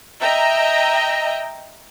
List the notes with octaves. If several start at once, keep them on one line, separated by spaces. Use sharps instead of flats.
D#5 E5 G5 A#5